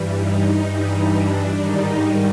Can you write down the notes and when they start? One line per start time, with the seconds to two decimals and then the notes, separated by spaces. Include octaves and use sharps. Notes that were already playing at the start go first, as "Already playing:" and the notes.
Already playing: G2 E3 G3
0.17 D#4
0.63 G2 E3 G3
1.10 D4
1.57 G#2 D#3 G3 D#4